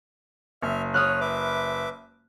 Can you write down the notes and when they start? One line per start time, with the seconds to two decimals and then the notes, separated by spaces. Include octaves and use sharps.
0.63 F#1 E5 F6
0.94 C#5 D#6 F6 F#6
1.21 B4 E5 D6